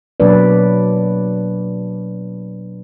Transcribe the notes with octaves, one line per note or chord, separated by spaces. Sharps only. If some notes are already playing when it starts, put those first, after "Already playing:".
B2 F#3 A#3 D4 B4 D5